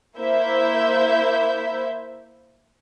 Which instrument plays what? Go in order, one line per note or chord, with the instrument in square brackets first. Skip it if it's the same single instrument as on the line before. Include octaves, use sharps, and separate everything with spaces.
[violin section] A#3 E4 C5 E5 G6